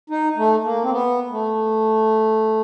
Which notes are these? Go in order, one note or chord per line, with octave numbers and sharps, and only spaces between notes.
D#4
A3
A#3
C4
B3
A3